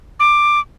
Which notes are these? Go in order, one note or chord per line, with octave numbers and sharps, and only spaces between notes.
D6